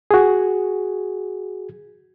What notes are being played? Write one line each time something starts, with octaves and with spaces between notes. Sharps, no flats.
F#4 G#4